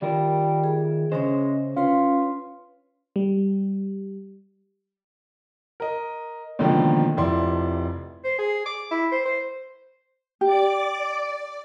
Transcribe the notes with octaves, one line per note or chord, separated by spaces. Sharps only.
D#3 G3 F4 A#4
G#4
C#3 G#3 C#4 C5 C#5
C#4 F4 B4 C6
G3
A#4 D#5
C#2 B2 D3 D#3 F3 A#3
F1 F3 E4 D5 C6
C5
G#4
D6
E4
C5
C5
G4 D5 D6